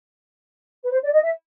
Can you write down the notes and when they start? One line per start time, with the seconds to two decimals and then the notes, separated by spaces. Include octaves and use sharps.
0.82 B4
0.92 C5
1.02 D5
1.12 D#5
1.22 E5